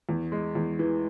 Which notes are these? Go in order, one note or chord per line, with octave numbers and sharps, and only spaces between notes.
E2
G#3
E2
E3